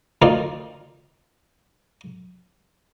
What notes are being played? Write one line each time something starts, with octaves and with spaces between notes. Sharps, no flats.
D2 D#3 D#4 F4 D5